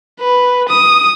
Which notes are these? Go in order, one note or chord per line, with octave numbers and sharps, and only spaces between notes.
B4
D#6